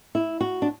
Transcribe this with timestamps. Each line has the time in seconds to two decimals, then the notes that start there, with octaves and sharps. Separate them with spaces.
0.15 E4
0.40 F#4
0.62 D4